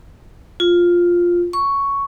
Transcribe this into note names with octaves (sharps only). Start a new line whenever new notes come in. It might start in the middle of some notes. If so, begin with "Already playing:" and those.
F4
C#6